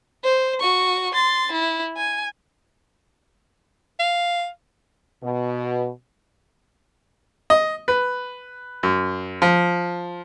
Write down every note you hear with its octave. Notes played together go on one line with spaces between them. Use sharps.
C5
F#4 C#6
C6 A6
E4
G#5
F5
B2
D#5
B4
F#2
F3